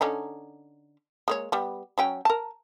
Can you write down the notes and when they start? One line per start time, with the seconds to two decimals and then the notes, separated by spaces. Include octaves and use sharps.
0.01 D3 C#4 D#4
1.28 G#3 A#3 C#5
1.52 G3 B3
1.98 F#3 C#4 G5
2.25 A#4 A5